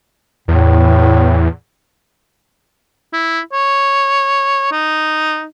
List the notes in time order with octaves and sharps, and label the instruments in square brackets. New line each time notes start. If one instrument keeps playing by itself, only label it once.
[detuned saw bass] E2 [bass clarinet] A2
[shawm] E4
C#5
D#4